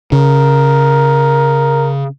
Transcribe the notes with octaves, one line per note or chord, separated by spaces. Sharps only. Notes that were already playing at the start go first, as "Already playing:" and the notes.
C#3 A#4